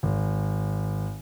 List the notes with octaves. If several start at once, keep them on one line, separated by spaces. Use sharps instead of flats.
G#1